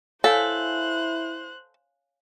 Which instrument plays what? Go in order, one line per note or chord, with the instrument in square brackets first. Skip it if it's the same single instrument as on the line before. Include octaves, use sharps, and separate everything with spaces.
[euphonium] E4 [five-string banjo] A4 [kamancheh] C5 F#6 [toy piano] C#5 F5 G#5